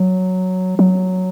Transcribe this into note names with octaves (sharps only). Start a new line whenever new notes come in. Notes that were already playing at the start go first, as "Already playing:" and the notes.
Already playing: F#3
F#3